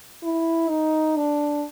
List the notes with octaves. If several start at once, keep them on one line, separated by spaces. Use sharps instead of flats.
E4
D#4
D4